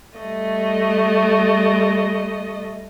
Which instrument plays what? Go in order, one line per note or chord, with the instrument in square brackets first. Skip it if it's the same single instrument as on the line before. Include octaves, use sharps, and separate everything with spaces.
[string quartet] G3 A3 D#5